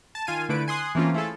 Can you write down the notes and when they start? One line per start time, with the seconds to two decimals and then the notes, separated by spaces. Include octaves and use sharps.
0.15 A5
0.27 D#3 F4 G#5 D#7
0.49 D3 A3 E4 B4 D7
0.68 G#5 C6 D#6 F#6
0.95 E3 A3 A#3 C4 C#4 F4
1.14 A3 E4 F4 G#4 A4